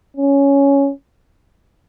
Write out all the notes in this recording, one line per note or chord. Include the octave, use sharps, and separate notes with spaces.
C#4